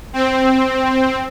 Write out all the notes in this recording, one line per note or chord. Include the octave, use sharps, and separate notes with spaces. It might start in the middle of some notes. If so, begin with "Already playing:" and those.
C4